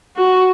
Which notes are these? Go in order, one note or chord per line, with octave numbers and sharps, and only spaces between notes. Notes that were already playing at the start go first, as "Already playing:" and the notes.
F#4